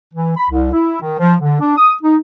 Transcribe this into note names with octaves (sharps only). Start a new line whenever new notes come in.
E3
B5
C2
E4
D#3
F3
D3
D4
D#6
D#4